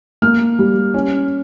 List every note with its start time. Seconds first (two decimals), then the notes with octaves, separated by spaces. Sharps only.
0.22 A#3 F6
0.59 G3
0.94 C#4